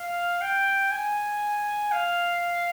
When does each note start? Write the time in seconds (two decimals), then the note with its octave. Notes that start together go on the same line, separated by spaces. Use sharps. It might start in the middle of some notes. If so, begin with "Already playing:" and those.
Already playing: F5
0.41 G5
0.91 G#5
1.92 F5